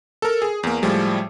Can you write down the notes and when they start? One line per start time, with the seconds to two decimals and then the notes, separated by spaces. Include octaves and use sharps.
0.22 A4 A#4
0.42 G#4
0.63 E2 A#3
0.82 A2 F3 G3 G#3